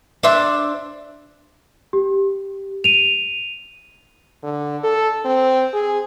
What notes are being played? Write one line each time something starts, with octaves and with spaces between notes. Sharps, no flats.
D4 C5 E5
G4
D#7 F7
D3
A4
C4
G#4